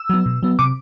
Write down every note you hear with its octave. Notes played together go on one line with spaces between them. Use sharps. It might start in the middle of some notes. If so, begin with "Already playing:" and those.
Already playing: E6
F#3 B3
B2
F#3 B3
C3 D6